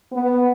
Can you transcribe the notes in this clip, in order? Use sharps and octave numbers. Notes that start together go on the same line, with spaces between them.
B3